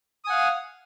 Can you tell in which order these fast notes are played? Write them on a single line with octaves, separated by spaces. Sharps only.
D#6 G#5 F#5 F5